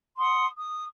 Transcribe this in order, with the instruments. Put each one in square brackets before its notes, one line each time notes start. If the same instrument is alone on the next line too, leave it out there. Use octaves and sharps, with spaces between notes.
[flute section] F#5 C6 D#6
D#6